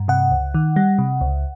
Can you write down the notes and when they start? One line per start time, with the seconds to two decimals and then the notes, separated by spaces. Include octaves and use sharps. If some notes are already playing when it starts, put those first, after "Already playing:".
Already playing: G2
0.08 C3 F#5
0.31 C#2
0.54 D#3
0.76 G3
0.98 C3
1.21 C#2